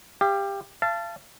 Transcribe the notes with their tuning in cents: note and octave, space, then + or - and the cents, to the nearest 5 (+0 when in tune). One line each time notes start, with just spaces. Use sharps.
G4 +15 F5 -25
F5 -35 A5 +0